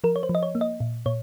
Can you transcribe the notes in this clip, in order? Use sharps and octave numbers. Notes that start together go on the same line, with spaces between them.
F3 A#4
C#5
C5
F3
D#5
C#5
A#3
D#5
A#2
A#2 C#5